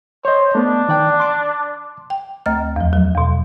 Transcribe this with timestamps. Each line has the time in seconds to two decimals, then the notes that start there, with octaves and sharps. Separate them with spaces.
0.25 C5 C#5 D#5
0.55 A3 B3 D4
0.89 D#3 D5 G5
1.20 C6 D6
2.10 G5
2.46 D2 A3 A#5 F6
2.76 E2 F3
2.93 F#3
3.15 E2 B2